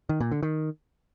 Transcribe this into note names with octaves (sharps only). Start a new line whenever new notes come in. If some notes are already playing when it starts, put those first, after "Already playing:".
D#3
A#2
D3
D#3